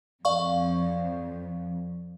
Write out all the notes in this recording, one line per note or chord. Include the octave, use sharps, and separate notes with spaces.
F2 D5 F5 C#6